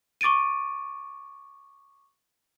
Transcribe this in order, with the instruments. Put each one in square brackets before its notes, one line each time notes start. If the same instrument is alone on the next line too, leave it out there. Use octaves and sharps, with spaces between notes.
[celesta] C#6 D6 A6 D7 D#7